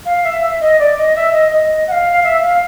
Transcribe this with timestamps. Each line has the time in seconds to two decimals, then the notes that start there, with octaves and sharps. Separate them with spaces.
0.06 F5
0.24 E5
0.42 E5
0.60 D#5
0.79 D5
0.97 D#5
1.16 E5
1.33 D#5
1.51 D#5
1.88 F#5
1.92 F5
2.24 E5
2.42 F5